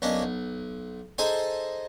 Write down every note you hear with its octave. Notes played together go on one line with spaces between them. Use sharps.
B1 A#3 C#4 D4 D#5
B1
D#4 G#4 A4 C5 D#5 G#5